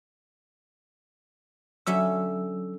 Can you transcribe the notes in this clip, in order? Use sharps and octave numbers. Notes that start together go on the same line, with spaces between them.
D3 F#3 C#4 E5 E6